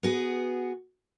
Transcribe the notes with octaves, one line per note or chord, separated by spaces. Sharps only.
B3 F#4 G#4